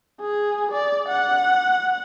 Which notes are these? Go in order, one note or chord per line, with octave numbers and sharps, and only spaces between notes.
G#4
D5
F#5